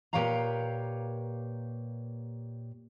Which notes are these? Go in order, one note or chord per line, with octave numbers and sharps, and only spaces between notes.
A#2 G4 B4 C#5 F5 A#5